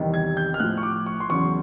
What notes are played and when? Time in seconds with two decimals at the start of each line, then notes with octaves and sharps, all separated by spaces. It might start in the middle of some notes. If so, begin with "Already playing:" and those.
Already playing: E2 C3 D#3 G3
0.14 G#6
0.37 G6
0.54 F6
0.60 A2 F3 F#6
0.78 C#6
0.83 D6
1.06 C#6
1.20 C6
1.29 E2 C#3 F#3 C#6